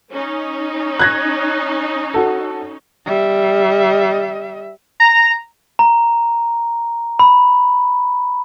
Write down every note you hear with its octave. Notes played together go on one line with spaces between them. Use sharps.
C#4 D#4
F#6 G#6 A#6
F#4 A4
G3 E5
A#5
A#5
B5